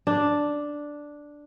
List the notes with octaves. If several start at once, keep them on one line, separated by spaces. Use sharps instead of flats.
D4